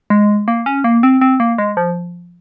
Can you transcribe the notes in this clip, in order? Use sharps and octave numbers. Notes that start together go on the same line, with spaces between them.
G#3
A#3
C#4
A#3
C4
C4
A#3
G#3
F3